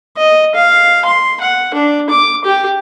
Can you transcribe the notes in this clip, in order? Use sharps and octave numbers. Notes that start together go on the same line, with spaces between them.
D#5
F5
C6
F#5
D4
D6
G4